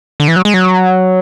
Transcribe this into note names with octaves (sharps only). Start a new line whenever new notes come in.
D3
E3
F#3
G#3
F#3